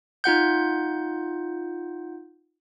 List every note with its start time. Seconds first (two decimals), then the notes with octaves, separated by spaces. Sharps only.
0.24 D#4 F4 F#5 G6